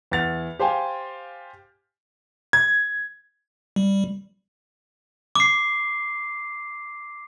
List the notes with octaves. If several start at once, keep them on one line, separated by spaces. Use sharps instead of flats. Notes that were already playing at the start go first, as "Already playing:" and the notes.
E2 F#5 A6 F7
G4 C5 F5 G5 G#5
G#6
G3
D6 C7